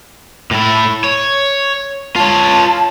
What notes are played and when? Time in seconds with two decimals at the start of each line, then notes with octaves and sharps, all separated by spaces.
0.51 A2 E4
1.04 C#5
2.16 F4 C#5 A5